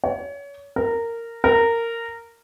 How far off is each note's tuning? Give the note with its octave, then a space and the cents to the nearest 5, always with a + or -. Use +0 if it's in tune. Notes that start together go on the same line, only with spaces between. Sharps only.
C#5 +30
A#4 -15
A#4 -15